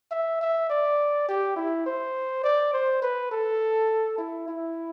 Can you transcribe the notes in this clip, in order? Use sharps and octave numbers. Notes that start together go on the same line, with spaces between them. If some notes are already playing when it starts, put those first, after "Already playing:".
E5
E5
D5
G4
E4
C5
D5
C5
B4
A4
E4
E4